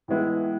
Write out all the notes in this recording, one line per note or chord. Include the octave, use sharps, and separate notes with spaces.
A2 E3 G#3 B3 E4